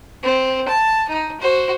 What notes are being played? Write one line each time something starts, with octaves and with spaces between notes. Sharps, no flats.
C4
A5
D#4
F#4 C5